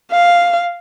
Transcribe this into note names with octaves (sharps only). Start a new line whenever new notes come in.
F5